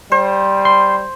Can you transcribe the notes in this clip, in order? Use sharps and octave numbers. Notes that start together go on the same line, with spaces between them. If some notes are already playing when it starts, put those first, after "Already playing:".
G3 C5
C6